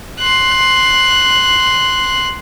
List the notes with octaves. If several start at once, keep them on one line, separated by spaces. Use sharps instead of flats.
C6 F#6